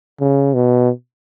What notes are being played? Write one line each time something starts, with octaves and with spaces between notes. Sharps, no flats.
C#3
B2